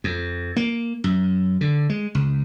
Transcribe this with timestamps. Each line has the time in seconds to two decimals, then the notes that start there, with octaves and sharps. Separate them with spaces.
0.04 F2
0.56 A#3
1.04 F#2
1.61 D3
1.90 G#3
2.15 C#2